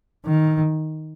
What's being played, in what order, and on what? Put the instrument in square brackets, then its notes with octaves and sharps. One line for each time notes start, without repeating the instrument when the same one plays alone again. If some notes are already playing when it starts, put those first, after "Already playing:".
[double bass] D#3